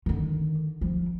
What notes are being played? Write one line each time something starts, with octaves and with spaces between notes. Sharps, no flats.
D3 D#3
F3